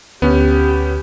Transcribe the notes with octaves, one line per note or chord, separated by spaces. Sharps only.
D2 B3 C#4 G4